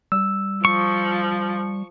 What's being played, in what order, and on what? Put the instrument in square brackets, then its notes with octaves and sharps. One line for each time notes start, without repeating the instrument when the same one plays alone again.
[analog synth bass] G3 [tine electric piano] E6
[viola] F3 [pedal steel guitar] C#6